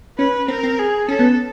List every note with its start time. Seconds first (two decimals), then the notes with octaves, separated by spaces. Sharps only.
0.18 C#4 B4
0.48 C4 A#4
0.63 C4
0.79 G#4
1.08 C#4 A4
1.19 B3